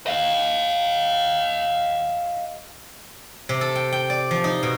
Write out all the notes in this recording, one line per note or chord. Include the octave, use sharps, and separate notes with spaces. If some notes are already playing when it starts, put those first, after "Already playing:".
D#5 F5
C3
A4
G5
G5
D5
F3
D#4
B2